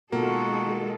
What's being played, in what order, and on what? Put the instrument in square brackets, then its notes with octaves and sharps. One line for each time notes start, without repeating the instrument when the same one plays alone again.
[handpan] B2 F4 A#4 [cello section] D#3 G#3 A4 [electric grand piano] A#3 [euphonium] F#4